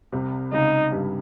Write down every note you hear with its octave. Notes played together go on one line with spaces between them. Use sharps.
C2 C3
C#2 C#3 D#4
G2 G3